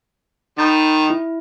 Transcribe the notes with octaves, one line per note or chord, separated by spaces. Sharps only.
D#3 B5 G6 A6
E4